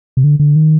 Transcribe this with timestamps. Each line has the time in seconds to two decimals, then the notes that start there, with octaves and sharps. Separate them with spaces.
0.17 C3
0.24 D3
0.39 D3
0.56 D#3